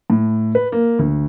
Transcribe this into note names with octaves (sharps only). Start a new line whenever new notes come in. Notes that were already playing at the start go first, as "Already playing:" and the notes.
A2
B4
A#3
D2